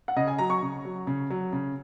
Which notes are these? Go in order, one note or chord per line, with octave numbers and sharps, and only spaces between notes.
F#5
C#3 D#5
G#5
F#3 A#5
C#6
C#3
F#3
C#3
F#3
C#3